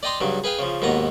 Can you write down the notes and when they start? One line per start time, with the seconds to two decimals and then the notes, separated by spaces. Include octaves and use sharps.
0.03 D5 D#5 G5 A#5 C6 D6
0.21 G2 C#3 F#3
0.44 G#4 B4 F5 G5
0.59 C#3 F3
0.82 D#2 G#2 B2 B3 A#5